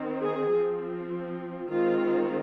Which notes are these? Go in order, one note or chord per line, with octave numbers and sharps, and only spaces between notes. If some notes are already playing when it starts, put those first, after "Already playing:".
Already playing: D#3 C4
G#4
F3 C4
D#3 G#3 C4 F4